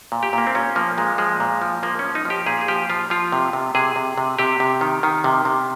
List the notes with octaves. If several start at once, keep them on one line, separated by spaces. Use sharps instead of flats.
A#2
G4
A#2 A#3
C4
A#2 C#4
F3 A#3
A#2 G#3
F3 G#3
A#2
F3
F3 A#3
C#4
F3
D#4
F3 G4
A#2 G#4
G#4
F3 G4
F3 F4
F3 F4
C3
C3
C3 G#4
C3
C3
C3 G4
C3
D#3
D#3
C3
C3